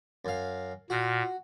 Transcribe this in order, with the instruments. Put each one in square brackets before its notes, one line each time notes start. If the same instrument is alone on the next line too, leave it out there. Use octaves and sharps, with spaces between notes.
[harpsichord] F#2 F5
[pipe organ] A#2 [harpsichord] F#4